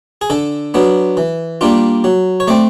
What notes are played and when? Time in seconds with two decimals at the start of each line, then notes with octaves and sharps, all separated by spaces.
0.21 G#4
0.30 D3 A4
0.74 F#3 B3 D4
1.17 E3
1.61 G3 A#3 D4 F4
2.04 F#3
2.40 C#5
2.48 A3 C4 D5